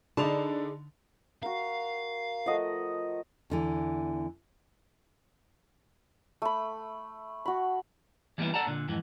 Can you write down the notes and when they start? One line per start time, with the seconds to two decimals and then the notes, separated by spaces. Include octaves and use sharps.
0.17 D3 D#4 G#4 D5 A5 B5 F7
1.43 F#4 A#4 F5
2.46 F3 A3 D#5 F#5
3.50 E2 D3 E3
6.42 A3 B5
7.46 F#4 B5
8.38 E3 G3 A#3 B3 E4
8.54 A4 D5 F#5 A5 A#5
8.67 A#2 D3
8.88 F2 G#2 E3